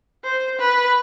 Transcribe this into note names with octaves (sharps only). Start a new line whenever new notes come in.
C5
B4